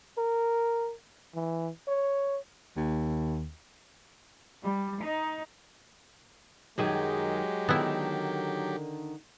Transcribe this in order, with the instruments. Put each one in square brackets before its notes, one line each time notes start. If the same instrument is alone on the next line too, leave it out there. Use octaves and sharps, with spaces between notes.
[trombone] A#4
E3
C#5
[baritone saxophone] D#2
[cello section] G3
D#4
[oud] F#2 D#3 G#4 [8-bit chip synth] F#3 G4 [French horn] G#3
[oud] D3 D#3 [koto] B3 E4